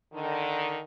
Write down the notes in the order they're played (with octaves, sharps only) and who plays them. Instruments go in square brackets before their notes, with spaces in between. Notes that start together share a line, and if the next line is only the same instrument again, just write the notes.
[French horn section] D3 D#3